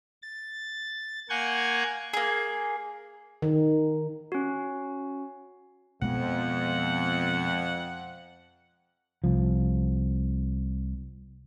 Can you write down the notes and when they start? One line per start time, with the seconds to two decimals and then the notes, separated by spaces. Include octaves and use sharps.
0.23 A6
1.30 A#3 F#5 G#5 C#6 G6 G#6
2.13 A#3 G#4
3.42 D#3
4.32 C#4 F#4
6.02 F2 B2 G#3 B3 F#5
9.24 C2 F3